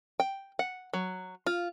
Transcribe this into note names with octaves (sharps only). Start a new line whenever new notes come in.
G5
F#5
F#3
F4